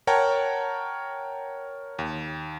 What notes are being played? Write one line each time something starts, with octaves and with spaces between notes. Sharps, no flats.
A#4 C#5 F#5 G5 A5 A#5
D#2